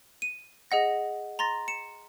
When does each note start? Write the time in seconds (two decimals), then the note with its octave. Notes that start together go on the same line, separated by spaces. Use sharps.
0.22 D#7
0.71 G#4 D#5 F#5 A#6
1.39 A#5 C6 A6 A#6
1.68 C#7 E7